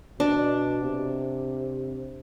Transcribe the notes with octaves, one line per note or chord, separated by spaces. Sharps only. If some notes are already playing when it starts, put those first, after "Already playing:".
B2 D4
C3